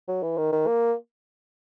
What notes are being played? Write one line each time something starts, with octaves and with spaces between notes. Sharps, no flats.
F#3
E3
D#3
D#3
A#3